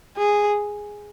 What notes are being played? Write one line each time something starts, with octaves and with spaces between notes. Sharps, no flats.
G#4